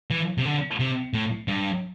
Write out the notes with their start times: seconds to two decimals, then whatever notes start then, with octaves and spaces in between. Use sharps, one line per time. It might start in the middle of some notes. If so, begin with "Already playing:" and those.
0.11 E3
0.38 C3
0.45 D3
0.80 C3
1.14 A2
1.48 G2